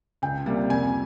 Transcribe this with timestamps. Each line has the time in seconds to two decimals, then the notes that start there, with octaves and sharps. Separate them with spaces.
0.22 C#2 G5
0.46 C3 G3 A#3
0.69 F2 G#5